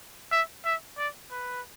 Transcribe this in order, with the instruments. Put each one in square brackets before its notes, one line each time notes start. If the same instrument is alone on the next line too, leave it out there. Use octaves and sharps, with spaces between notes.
[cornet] E5
E5
D5
B4